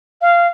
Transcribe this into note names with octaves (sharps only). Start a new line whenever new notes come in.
F5